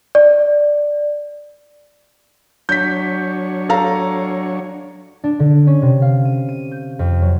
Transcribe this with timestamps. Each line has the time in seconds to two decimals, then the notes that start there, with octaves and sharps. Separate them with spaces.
0.15 D5
2.69 F#3 D4 C#5 G6 B6
3.69 A4 F5 A#5
5.24 D4
5.39 D3
5.67 C#4
5.82 C3
6.02 F5
6.25 D#7
6.49 D#7
6.71 G6
6.99 F2
7.22 F#3